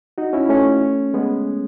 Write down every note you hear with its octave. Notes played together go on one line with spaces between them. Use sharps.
D#4 F#4
C#4 E4
A3 C#4
G#3 B3